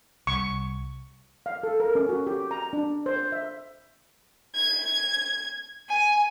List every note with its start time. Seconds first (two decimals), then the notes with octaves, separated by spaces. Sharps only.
0.27 C2 C#6
1.46 F5
1.63 A4
1.80 A#4
1.95 C#4
2.09 F#4
2.27 G4
2.51 A#5
2.73 D4
3.06 C5
3.32 E5
4.55 G#6
5.88 G#5